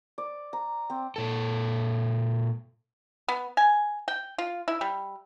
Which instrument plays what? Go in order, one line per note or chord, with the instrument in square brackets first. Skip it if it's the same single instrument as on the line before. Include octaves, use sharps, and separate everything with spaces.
[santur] D5
A#5
C4
[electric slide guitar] A#2 A4
[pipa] B3
G#5
G5
F4
E4
G3